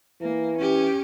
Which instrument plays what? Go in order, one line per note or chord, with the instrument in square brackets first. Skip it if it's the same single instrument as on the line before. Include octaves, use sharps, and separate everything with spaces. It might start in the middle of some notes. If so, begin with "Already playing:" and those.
[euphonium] E3 [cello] A#3
[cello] C#4 G4